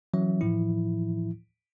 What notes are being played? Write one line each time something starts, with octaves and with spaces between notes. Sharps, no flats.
E3 F#3 C#4 E5
A2 E3 F3 E4